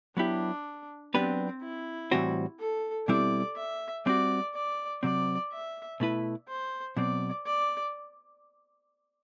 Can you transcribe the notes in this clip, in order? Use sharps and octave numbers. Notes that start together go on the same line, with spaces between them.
F#3 B3 D4 E4 G4
F#3 B3 C4 D4 G4 B4
E4
A2 E3 G3 C4 F#4
A4
B2 G3 C4 E4 D5
E5
G3 C4 F#4 D5
D5
C3 F#3 C4 D5
E5
B2 A3 E4 B4
C5
B2 F#3 C4 D5
D5